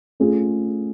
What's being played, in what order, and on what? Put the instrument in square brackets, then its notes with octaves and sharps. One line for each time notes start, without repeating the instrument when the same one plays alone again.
[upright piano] A3 C#4 F4 G#4